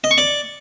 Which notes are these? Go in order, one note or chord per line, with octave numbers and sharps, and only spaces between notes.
D#5
C#6
D5